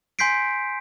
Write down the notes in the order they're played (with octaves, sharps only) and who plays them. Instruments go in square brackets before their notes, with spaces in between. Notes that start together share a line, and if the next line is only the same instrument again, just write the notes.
[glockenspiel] G#5 C6 G6 B6 C7 D7